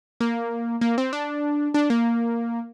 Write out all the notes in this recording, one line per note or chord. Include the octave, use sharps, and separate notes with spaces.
A#3
A#3
C4
D4
D4
A#3